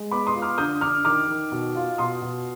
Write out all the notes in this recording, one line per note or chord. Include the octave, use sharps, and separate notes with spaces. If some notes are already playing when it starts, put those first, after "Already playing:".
Already playing: G#3
B3 B5 D6
C6 D#6
F4
D6 F6
D3 D#6 G6
D3 D6 F6
D#3 D6 F6
D#3
B2
F4
B2 C6 D#6
B2